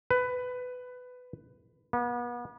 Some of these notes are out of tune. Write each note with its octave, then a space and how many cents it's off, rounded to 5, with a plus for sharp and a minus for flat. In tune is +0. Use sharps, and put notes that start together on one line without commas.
B4 +15
B3 -35